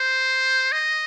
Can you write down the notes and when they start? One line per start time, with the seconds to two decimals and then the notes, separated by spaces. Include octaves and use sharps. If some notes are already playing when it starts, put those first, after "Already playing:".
Already playing: C5
0.72 D#5